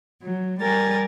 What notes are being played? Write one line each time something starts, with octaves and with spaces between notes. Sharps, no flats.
F#3
G3 A#4 G#5 A6